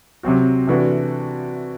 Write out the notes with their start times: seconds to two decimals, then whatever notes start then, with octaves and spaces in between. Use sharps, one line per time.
0.23 C3 F#3 C4 F#4
0.67 C3 E3 A3 D4 F#4